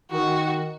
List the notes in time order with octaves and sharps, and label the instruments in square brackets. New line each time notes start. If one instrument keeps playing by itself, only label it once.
[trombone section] D#3 [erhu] F#4